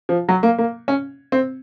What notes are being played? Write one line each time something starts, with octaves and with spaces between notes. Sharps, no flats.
F3
F#3
A#3
A#3
C#4
C4